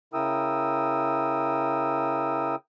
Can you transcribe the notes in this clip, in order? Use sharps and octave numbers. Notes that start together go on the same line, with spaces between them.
C#3 E4 A#4 G5 D#6 E6